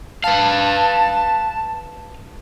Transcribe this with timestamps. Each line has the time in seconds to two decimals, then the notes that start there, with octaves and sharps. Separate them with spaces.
0.24 B4 F5 A5